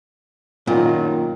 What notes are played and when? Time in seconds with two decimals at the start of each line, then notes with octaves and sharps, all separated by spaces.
0.67 F#2 A#2 D#3 F4